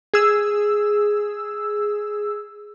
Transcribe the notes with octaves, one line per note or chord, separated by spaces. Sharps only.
G#4 E6